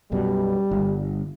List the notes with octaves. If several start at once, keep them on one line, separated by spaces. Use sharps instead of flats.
B1 F#2 B2 G3
G1